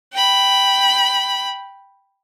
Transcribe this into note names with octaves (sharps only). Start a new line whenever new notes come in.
G5 B5